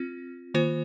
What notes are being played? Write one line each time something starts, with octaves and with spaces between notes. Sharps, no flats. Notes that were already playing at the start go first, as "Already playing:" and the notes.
Already playing: C4 F4
D#3 A#3 F4 C5